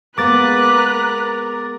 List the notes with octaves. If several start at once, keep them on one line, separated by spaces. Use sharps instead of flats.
G#3 A#3 B3 A#4 B4 D6 F#6 A6